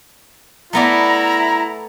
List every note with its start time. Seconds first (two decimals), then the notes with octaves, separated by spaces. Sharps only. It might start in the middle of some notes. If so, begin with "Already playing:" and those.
0.73 A3 B3 E4 D5 A#5